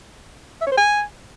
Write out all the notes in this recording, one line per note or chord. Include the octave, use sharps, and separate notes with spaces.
E5
C#5
C5
G#5